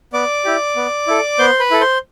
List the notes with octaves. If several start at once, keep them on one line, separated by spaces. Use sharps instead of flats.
B3 D5 D6
E4 G4
B3
E4 A4
B3 C5 C6
B4 B5
E4 A4
C5 C6